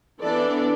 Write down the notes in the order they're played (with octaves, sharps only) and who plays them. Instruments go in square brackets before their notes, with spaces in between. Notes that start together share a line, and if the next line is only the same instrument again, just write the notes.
[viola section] E3 B3 D4 A4 D5